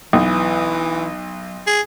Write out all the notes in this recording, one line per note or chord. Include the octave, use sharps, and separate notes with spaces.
B1 E3
G#4